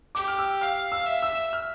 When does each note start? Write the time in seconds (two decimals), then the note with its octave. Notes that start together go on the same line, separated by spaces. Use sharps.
0.15 G4 D6
0.28 F6
0.39 E6
0.61 F5 F6
0.92 E6
1.06 E5
1.23 E6
1.53 F6